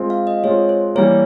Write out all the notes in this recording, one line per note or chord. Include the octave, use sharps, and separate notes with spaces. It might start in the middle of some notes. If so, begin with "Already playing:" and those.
Already playing: G#3 C4 F4
F5
D#5
G#3 C4 F4 C#5
C5
E3 G3 A#3 C#5